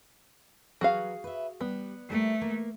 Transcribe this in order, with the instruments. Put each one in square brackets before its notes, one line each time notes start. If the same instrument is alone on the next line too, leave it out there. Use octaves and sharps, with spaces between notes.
[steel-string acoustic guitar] F#3 B4 [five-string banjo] F#4 G#4 F5
[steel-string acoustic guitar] B4 E5
[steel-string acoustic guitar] G3 [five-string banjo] B3
[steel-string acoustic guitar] G3 A#4 E5 [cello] A3
[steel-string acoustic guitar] A#3